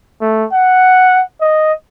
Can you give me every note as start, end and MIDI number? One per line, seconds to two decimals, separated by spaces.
0.21 0.45 57
0.53 1.23 78
1.41 1.73 75